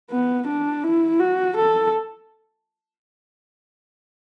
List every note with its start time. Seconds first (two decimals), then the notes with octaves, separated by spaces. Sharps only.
0.11 B3
0.47 D4
0.84 E4
1.20 F#4
1.57 A4